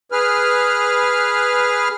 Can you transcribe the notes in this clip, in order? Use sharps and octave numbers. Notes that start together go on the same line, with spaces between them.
G#4 B4 F6